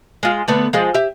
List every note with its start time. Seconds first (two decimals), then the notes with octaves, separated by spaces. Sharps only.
0.23 G#3 F4
0.48 D3 A3 B3
0.73 F3 G#3 G#4
0.94 G4 E5